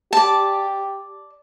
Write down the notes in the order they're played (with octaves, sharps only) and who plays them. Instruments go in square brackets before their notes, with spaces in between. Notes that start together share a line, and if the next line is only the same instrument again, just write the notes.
[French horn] G4 [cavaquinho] D5 A5